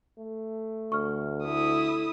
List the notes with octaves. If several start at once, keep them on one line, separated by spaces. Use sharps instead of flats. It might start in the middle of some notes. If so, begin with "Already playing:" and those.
A3
D2 C#6 F6
A3 E4 A4 D#6